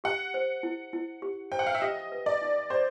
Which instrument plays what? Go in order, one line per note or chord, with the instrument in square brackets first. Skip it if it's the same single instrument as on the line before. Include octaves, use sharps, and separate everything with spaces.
[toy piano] G4 [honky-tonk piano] F#5
[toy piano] C5
E4
E4
G4
[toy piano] C5 [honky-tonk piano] G5
[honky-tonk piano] F#5
F5
E5
[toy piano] G4 [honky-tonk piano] D#5
[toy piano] B4
[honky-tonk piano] D5
[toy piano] D#4
[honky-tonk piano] C5 [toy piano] D5